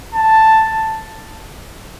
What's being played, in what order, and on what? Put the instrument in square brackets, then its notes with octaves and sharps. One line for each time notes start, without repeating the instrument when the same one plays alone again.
[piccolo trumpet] A5